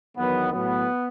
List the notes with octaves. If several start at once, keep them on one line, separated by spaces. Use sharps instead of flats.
E2 D#3 F#3 B3
A2 F#3 B3